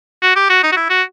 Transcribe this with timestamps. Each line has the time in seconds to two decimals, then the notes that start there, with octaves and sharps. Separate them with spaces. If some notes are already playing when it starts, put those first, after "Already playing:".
0.23 F#4
0.36 G4
0.50 F#4
0.63 D#4
0.72 F#4
0.77 E4
0.90 F#4